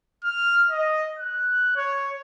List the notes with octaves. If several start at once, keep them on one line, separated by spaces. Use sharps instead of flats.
F6
D#5
F#6
C#5